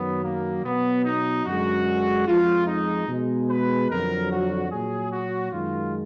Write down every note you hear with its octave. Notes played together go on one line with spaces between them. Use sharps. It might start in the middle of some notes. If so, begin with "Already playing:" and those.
Already playing: F#2 D#3 F#3 B3
A#3
B2 F#3 B3
D#4
F#2 D3 G#3 F#4
F2 F3 G#3 F4
D#4
B2 G#3
B4
F2 D3 F#3 A#4
F#4
A#2 F#3 G#4
F#4
F#2 D#3 G#3 F4